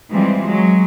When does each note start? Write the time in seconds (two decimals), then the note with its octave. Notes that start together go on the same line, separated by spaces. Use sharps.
0.12 E3 F3 G3 G#3 C4
0.45 F#3 G#3